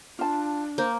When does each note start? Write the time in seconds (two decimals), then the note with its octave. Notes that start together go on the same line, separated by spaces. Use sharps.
0.19 D4 F4 A5
0.78 A#3 C5